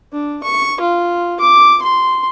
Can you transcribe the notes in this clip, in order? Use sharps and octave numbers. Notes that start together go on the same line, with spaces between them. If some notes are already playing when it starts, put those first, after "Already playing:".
D4
C#6
F4
D6
C6